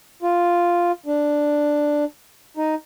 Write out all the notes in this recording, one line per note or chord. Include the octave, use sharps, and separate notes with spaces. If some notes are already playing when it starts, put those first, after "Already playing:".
F4
D4
D#4